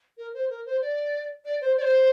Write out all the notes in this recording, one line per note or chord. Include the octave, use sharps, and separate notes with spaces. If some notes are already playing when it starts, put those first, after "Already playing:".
A#4
C5
A#4
C5
D5
D5
C5
D5
C5